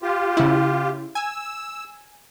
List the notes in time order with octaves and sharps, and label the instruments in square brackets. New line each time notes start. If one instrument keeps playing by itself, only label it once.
[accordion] F4 G4
[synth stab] C#3 E4
[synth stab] G#5 [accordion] E6